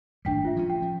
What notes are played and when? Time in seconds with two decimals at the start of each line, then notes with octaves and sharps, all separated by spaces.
0.25 G#1 A2 G3 D4 G5 B6
0.45 F4 E5
0.57 F3 C#4
0.70 G5
0.82 F3